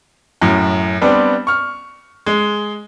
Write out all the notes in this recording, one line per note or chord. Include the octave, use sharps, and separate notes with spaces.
F#2 A2
G3 B3 C4 D4
C#6 F6
G#3